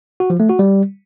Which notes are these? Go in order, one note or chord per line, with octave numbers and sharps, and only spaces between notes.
F#4
F3
A3
F#4
G3